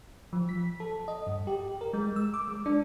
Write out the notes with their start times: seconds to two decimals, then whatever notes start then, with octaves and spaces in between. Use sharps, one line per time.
0.33 F3
0.49 B6
0.80 A4
1.08 D#5
1.27 G2
1.47 G4
1.81 A#4
1.93 G#3
2.16 E6
2.34 D6
2.48 G#3
2.66 D4